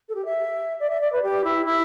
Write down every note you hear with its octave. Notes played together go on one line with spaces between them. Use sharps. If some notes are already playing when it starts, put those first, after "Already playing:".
A4
G4
E5
D5
E5
D5
B4
G4
E4
E4